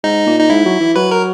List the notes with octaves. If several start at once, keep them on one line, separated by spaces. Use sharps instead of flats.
G#2 D#4
A#2
D#4
G#2 E4
F#3
E3
F#3 B4
A#4